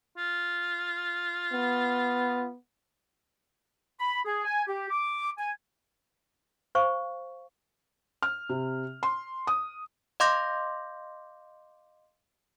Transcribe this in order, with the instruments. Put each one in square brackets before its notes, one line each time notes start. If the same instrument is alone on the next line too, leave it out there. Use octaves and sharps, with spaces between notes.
[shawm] F4
[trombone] B3
[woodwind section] B5
G#4
G#5
G4
D6
G#5
[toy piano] C5 F5 C#6
[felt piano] F6
C3
C6
D#6
[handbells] D#5 F5 C6 D6 G6 A#6